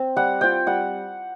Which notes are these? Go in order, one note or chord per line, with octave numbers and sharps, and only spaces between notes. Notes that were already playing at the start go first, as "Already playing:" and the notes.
Already playing: C4
G3 F#5
C4 F4 G5
G3 F#5